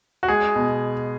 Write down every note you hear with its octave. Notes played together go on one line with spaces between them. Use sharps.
F#4
G#3 G#4
B2